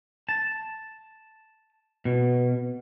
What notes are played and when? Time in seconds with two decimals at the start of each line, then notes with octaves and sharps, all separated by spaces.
0.29 A5
2.05 B2